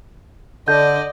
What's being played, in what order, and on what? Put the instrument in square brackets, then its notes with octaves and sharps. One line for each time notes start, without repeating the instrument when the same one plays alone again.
[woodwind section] D3 [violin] D5 D#5 [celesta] G6